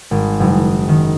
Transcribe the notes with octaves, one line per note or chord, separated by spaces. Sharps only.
G#1
F#1
D#3